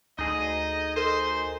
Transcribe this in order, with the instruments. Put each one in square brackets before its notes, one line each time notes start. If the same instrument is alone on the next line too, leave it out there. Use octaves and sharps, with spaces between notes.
[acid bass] D2 [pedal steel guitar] D#4 G#4 [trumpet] D#5
[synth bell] A4 A#4 D#5 [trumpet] C5